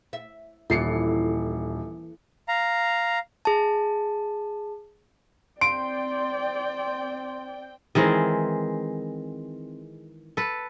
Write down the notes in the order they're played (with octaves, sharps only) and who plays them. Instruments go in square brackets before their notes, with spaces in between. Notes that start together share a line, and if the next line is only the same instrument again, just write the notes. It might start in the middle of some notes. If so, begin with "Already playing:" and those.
[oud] E5
[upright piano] D#1 C7 C#7 [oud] E3 A4
[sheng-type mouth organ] F5 A#5
[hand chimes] G#4 A5
[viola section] C4 G5 [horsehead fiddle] D5 [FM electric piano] C6 [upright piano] D7
[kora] D#3 E3 G#3 C4
A4 B4